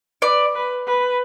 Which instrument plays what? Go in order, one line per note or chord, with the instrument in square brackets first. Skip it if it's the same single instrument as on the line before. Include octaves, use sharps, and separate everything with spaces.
[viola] B4 [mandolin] D5
[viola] B4
B4